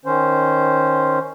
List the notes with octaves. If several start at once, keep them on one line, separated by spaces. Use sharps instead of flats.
D#3 C#4 C5